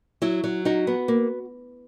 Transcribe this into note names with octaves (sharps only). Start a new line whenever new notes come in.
F#3 E4
F#3
D#4 F#4
B3
A#3